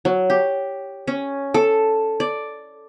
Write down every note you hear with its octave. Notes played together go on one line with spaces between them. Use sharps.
F#3
G4
C#4
A4
D5